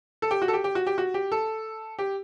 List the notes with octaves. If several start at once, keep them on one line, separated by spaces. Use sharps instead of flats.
A4
G4
F#4
A4
G4
G4
F#4
G4
F#4
G4
A4
G4